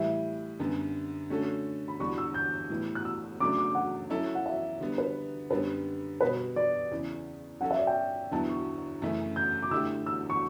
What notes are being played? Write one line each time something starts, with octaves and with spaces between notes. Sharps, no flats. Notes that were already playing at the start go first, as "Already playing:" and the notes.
Already playing: A2 E3 G3 E5
F#2 D3 G3 B3
D3 A3 C#4 F#4 A4
B5
E2 D3 G3 D4 F#4 C#6
E6
G6
A2 E3 G3 B3
F#6
E6
C#3 F#3 A3 D4 D6
D6
F#5
F#3 C#4 E4 A4
F#5
E5
D3 G3 B3
B4
F#2 D3 G3 B3 B4
B2 G3 B3 F#4 B4
D5
E2 C#3 E3
F#3 C#4 F#4 A4 F#5
E5
D5
G5
E2 D3 F#3 B3 E4 A5
C#6
F#2 C#3 E3 A3 E4
G6
D6
D3 A3 E4 G4 E6
E6
C#6